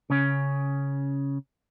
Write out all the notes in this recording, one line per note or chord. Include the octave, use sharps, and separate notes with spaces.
C#3 C#4